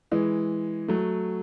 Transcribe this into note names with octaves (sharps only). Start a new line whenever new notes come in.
E3 G#3
F#3 A3